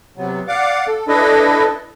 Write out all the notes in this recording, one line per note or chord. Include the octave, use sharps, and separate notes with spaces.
C3 F#3 B3
D5 F5 F#5 D6
A4
D4 E4 A4 B4 D#5